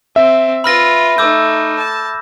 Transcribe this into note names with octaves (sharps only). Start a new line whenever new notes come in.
C4 E5
F4 B4 B5 F6 A#6
A3 D#4 D6 E6 G6
A5